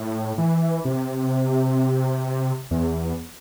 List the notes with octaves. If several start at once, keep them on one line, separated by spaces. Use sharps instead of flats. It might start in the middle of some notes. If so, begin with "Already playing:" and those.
Already playing: A2
E3
C3
E2